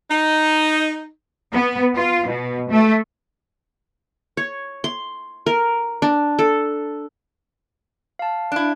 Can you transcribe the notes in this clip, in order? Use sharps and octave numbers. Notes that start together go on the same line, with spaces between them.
D#4
B3
F4
B2
A3
C#5
C6
A#4
D4
A4
F5 A5
D4 E4